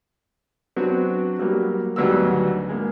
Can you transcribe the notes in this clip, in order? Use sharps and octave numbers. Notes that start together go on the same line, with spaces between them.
F#3 B3 C4 D4 F#4
F#3 G3 A#3
G#1 D2 F#3 G3 B3 E6
G#3 A#3